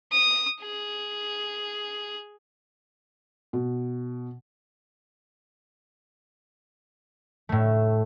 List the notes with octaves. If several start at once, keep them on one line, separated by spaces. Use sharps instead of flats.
D#6
G#4
B2
A2 A3